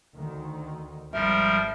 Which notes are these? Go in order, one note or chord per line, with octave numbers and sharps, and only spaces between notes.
D2 D#3
G#1 F3 G3 A#4 E5